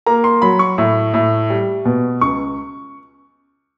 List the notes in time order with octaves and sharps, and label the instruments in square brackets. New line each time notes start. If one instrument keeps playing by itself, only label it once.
[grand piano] A#3 A#5
C6
F#3 B5
C#6
A2
A2
G3
B2
C#2 C#6